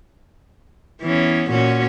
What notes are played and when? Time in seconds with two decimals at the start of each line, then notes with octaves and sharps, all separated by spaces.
1.02 E3 B3 C#4
1.51 A#2 C#4 F#4